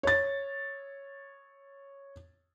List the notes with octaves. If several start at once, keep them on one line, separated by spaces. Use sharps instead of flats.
C#5 A6